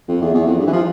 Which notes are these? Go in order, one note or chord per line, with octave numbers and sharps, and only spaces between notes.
F2
E2
E2
F2
G2
E3
F3